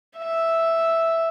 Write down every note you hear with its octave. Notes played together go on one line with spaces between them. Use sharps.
E5